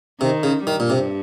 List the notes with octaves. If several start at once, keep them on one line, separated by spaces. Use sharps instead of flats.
C3 D#3
C#3
G2 D#3 G3
A#2
C3